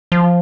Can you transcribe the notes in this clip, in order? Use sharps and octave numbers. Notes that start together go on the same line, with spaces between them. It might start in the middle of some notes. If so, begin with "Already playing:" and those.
F3